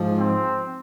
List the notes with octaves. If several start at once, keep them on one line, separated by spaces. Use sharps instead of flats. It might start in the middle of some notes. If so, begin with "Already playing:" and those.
Already playing: G#2 F3
C4